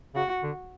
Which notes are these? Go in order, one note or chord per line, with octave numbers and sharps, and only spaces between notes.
C#3 F#4
D3